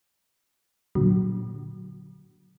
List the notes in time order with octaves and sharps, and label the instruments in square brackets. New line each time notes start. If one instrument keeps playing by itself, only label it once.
[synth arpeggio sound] A#2 D3 F#3